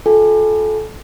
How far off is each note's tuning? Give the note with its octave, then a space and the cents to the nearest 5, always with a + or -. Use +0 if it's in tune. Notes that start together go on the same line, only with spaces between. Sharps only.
F4 +30 A4 -25 G#5 -35